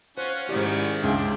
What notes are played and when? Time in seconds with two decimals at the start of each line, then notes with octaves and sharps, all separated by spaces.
0.18 C#4 F4 C5 F#5
0.49 G#2 D#3 C#4 E4 G4 C5 D5
1.03 C#2 D4